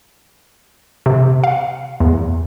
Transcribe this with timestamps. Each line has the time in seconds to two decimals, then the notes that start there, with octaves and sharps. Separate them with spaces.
1.06 C3
1.44 F5
2.00 E2